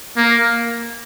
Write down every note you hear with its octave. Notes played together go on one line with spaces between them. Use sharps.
A#3